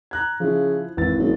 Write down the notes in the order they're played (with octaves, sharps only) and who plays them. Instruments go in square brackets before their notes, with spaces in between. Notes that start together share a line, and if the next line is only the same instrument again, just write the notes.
[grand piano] A#5 F#6 G#6
[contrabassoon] C#3 [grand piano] F3 E4
[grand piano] G#1 A6 [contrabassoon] E3
[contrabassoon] F#1